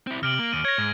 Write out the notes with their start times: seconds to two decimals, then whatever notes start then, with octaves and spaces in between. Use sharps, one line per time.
0.07 C4 E4
0.23 C3 F6 D7 F#7
0.39 A#3
0.53 D#2 D#7
0.65 C#5 G#6 A#6
0.78 G#2